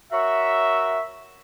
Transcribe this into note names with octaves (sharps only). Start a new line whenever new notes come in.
F#4 A#4 C#5 E5